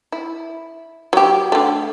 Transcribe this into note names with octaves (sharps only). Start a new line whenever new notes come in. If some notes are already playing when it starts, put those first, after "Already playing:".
E4
F#3 G4
D3 A3